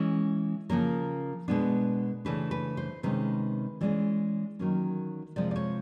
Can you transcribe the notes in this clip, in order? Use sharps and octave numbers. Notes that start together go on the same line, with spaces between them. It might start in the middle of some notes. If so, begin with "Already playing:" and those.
Already playing: E3 G#3 C#4
C#3 F3 A#3 C#4 A#4
B2 G#3 B3 D4
C#3 E3 A3 D4 B4
B4
C5
C3 D#3 G#3 C#4 B4
E3 G#3 C#4 D5
D#3 F#3 A#3 C#4
C3 F3 G#3 D5
D5
C#5